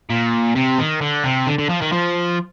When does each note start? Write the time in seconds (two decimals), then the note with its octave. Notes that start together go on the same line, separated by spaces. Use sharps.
0.10 A#2
0.55 C3
0.79 D#3
1.01 D3
1.24 C3
1.47 D3
1.58 D3
1.69 F3
1.81 D#3
1.92 F3